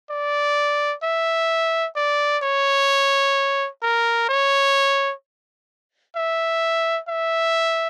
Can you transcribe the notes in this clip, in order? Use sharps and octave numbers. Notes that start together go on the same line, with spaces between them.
D5
E5
D5
C#5
A#4
C#5
E5
E5